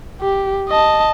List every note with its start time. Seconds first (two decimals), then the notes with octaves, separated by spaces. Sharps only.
0.21 G4
0.69 D#5 A5